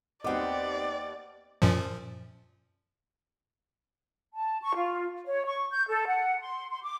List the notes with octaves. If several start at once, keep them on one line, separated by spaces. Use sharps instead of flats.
D#2 B3 C4 D5 D#5 F#5 D6
F#2 A#2 F3
A5
C#6
F4
C#5
C#6
G6
A4
F#5
C6
C6
D6